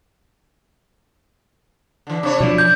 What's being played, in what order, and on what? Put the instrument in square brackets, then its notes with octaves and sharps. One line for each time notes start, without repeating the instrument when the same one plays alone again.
[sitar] D3 E3
C3 D4 C#5
[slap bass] B2 F3 [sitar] E4
[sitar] F#2 [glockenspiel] G6